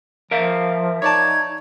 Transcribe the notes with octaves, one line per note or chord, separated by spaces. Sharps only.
F3 A#4 E5 F5
D#4 C#5 D5 A5 G#6